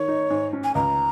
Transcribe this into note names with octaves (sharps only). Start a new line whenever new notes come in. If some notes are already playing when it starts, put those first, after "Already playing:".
Already playing: D#3 C#5
D#4
G#2
C#4
G#5
C#2 A#5